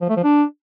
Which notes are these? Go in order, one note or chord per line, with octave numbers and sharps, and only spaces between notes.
F3
A3
F3
D4